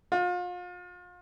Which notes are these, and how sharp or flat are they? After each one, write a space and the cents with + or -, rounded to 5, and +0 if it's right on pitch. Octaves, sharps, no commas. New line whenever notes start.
F4 +35